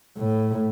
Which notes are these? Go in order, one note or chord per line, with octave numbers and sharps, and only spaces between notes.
A2